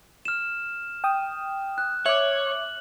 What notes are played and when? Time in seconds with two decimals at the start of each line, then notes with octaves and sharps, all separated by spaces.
0.25 F6 E7
1.04 G5 D#6
1.78 F#6
2.06 C#5 E5 D6 F#7